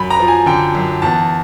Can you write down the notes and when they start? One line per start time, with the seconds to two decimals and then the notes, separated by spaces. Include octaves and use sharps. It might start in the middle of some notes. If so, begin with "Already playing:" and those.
Already playing: F#2 B5
0.10 A#5
0.19 F3
0.28 G#5
0.46 D3 G5
0.75 F#2
1.02 E2 A5